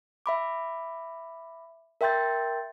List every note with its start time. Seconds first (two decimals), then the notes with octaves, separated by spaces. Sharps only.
0.26 E5 B5 D6
2.01 A#4 E5 G5 C6 G6 A6